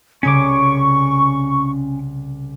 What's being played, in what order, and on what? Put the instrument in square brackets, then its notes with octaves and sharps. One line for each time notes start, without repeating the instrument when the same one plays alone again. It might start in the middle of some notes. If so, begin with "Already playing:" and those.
[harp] C2 C#3 G#6 [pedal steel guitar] C#4 D6 [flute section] C#6